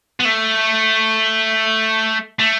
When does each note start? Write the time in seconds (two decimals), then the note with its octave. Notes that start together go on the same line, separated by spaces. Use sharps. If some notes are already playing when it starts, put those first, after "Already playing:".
0.20 B3
0.25 A3
2.39 A3